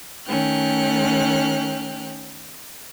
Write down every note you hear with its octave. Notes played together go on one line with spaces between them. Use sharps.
D#3 A3 C#4 G5 F6 F#6